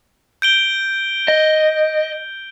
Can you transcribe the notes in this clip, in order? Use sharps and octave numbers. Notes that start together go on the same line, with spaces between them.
G6 D7 G7
D#5